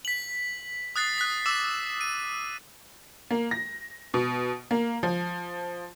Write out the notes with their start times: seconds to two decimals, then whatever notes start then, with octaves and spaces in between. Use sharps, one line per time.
0.05 B6 F#7
0.96 D#6 F#6 A6 C7
1.18 F#6 B6
1.46 D6 E6 E7
2.01 D#7
3.31 A#3
3.51 A#6
4.14 B2
4.71 A#3
5.03 F3